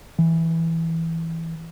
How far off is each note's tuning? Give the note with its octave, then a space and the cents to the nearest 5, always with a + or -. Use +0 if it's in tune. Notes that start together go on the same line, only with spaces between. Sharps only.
E3 -5